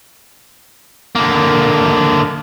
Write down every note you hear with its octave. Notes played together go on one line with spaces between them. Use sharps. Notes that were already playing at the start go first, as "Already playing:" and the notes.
D3 A#3